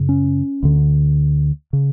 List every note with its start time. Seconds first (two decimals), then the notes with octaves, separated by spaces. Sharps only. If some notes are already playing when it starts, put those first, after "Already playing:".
Already playing: F#2 C#3
0.09 C#4
0.63 D2 D3
1.73 C#3